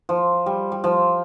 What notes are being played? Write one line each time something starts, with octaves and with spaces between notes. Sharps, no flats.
F3
G3
G3
F3